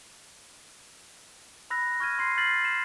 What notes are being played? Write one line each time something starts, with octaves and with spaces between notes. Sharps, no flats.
B5 E6 F#6 A#6
C#6 F6 G#6 A#6 D#7
C6 C7
F6 G6 A6 B6 C7 F#7
C7 E7